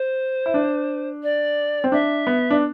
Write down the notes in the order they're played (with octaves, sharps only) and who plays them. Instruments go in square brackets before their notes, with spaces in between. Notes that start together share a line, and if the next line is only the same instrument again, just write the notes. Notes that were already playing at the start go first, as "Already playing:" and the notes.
Already playing: [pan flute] C5
[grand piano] E4
D4
[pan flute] D5
[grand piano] C4
[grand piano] D4 [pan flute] E5
[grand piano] B3
D4